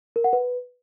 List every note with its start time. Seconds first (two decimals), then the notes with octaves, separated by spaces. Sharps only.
0.16 A#4
0.24 F#5
0.33 B4